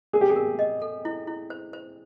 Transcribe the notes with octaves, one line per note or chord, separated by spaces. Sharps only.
G#4 A#4
G4
G#4
A#4
D#5
A4
E4
E4
C5
C5